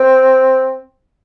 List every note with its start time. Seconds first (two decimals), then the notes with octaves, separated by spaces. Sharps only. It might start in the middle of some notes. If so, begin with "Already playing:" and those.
Already playing: C4